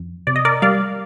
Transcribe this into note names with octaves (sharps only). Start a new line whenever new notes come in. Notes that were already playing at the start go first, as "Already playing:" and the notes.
Already playing: F2
C3 D5
D#5
A#4 D5
G3 D5 F5